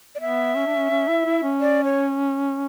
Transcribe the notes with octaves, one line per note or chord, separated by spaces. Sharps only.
D5
B3 E5
C#4
D4
C#4
C#4
E4
E4
C#4
D5
C#5